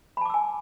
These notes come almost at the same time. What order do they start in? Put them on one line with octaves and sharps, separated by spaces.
B5 A5 D6 E6 G#5